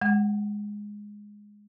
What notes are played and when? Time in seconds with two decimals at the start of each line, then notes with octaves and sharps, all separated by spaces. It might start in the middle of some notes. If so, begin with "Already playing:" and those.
0.01 G#3 F#5